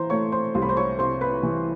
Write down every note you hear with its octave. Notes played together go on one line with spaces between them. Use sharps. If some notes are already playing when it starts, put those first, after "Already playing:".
Already playing: E3 C5 A#5 C6
A3 C#5 C#6
C5 C6
C2 C6
B5
C5 C6
C#5 C#6
C3 C5 C6
B4 B5
E3